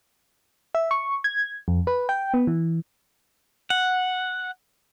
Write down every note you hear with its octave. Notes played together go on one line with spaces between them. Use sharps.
E5
C#6
G#6
F2
B4
G5
B3
E3
F#5